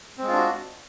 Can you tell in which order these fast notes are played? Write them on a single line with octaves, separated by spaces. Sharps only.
C4 G#3 F4 D4 F#4